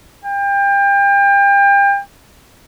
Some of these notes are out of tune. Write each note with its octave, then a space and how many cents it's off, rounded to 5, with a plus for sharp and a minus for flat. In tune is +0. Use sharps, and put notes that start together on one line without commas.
G5 +30